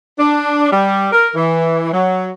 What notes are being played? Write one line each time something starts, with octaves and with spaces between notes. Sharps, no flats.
D4
G3
A#4
E3
F#3